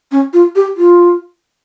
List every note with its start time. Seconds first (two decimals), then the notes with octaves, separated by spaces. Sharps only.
0.12 C#4
0.33 F4
0.55 G4
0.77 F4